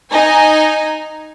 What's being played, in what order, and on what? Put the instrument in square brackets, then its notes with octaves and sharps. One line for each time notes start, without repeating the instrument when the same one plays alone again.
[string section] D#4 G#5